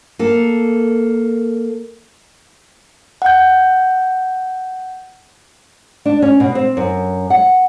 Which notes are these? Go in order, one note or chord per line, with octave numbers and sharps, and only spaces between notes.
A#3 A4
F#5 G6
D4
C#4
B2
C4
F#2
F#5